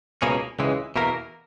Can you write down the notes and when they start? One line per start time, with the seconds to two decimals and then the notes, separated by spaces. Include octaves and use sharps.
0.22 C#2 B2 A#3 C#4 G#4
0.59 C#2 C#3 E3 G#3
0.96 E2 B2 A#3 E4 A#4